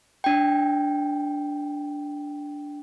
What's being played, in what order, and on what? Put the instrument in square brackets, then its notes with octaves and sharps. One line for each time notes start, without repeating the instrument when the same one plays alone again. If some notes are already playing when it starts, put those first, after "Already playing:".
[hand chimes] D4 G5